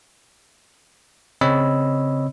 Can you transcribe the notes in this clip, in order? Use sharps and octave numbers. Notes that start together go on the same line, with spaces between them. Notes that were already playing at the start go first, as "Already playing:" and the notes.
C#3 C4 C#5 D#5 B5 E6